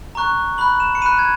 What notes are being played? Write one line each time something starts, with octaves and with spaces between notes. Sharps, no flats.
A#5 C#6 F#6
B5 F#6 F#7
E7
C#7
B5 F#6 D#7
G#6